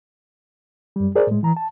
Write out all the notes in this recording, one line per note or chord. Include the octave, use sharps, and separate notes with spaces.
F#2 G3
G#4 A#4 C5 D5
A2 G#3
E3 A#5
A5